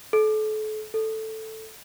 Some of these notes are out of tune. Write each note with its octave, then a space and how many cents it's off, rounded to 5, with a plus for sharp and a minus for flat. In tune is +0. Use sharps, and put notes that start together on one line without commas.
A4 -35
A4 +0